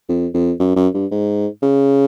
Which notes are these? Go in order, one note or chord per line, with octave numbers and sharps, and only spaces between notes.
F2
F2
F#2
F#2
G2
G#2
C#3